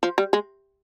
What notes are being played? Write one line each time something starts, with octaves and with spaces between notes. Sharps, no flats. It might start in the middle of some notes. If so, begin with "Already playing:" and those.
F3
G3
G#3